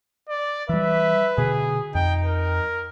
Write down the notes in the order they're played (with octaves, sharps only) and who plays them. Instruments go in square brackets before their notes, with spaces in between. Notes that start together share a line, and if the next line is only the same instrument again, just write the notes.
[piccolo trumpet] D5
[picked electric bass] E3 G3 [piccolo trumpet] B4 [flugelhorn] E5
[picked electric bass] B2 D3 [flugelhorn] G#4
[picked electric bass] F2 [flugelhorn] D#4 [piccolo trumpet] G5
[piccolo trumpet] A#4